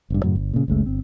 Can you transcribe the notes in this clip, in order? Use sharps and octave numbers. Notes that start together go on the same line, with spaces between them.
F1 G2
F#2 A2 C#3
G1
A#2 C#3
F#1 C#2 G#3 A3
G1 C4